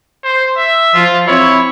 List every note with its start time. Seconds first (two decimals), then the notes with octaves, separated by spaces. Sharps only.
0.24 C5
0.57 E5
0.95 F3 F4
1.28 C4 E4 C#5